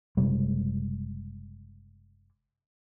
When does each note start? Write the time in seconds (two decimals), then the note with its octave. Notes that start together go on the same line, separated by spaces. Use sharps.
0.17 F#1 C3 G3 G#3